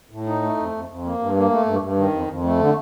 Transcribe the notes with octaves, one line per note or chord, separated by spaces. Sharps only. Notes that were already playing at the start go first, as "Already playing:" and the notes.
A2
D#4
A3
F2
F2
F2
A#3
G2
A#3
A3
G2
G2
D#3
F2
F2
A3
D3